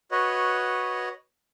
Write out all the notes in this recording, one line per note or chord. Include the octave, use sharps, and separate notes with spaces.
F#4 B4 C#5 D#5